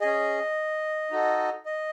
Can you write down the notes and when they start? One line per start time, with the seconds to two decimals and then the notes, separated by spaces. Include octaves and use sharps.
0.01 C#4 G#4 D#5
1.11 D#4 F#4 A4
1.66 D#5